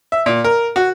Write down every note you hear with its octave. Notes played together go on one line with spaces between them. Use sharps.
E5
A#2
A#4
F#4